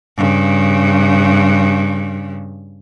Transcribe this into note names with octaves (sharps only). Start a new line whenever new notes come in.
G2 C#3